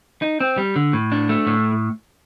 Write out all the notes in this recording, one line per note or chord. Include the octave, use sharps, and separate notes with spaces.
D#4
C4
G3
D3
A2
D4
A3
A2